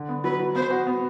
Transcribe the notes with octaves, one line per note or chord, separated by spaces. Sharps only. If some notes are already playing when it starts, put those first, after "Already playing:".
Already playing: D3
B3
F#3 B4
F#3
B3 C5
F#4
B3